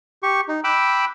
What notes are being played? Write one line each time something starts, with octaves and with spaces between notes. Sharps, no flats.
G4 C#6
D#4
G5 B5 D6 E6 F#6